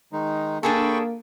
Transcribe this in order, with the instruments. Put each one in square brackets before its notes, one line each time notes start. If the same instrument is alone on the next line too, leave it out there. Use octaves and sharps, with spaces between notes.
[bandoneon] D#3 G#3 D#4
[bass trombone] A#3 [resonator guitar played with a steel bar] D4 G#4 A4 [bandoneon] G5 B5 C#6